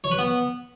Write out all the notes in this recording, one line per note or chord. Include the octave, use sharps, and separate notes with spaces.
C#5
B4
B3